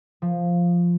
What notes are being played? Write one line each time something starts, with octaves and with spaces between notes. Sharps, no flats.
F3